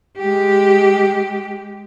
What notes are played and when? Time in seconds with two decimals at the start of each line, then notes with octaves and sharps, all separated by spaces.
0.18 G#3 G4